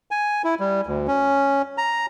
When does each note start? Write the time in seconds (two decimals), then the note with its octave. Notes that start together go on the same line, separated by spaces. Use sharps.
0.11 G#5
0.44 E4
0.60 G3
0.87 D2
1.07 C#4
1.78 A#5